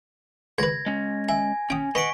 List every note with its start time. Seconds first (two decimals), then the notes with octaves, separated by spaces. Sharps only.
0.58 C#2 B4 G#6 A#6
0.86 G#3 C#4
1.29 E5 G#5
1.70 C#4 G5 D#6
1.95 B3 D#5 F#5 C#6 B6 D7